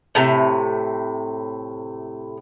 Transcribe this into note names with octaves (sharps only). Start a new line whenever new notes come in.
A2 C3